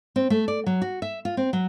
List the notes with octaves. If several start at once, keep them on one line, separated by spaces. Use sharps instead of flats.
C4
A3
D5
F#3
F#4
E5
F4
C4
F#3